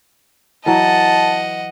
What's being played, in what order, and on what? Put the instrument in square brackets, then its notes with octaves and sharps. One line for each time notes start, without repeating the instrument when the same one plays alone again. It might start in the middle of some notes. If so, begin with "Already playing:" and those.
[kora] E3 F#3 [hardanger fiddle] D#5 F#5 [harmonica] A5